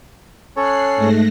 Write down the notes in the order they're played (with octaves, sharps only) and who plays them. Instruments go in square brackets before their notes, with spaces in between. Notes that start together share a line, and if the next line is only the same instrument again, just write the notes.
[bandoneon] C#4 A4 C#5 [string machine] F#6 C7
[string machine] G#2 A3 A#6